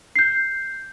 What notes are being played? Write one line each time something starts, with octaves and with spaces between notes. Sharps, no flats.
G6 C7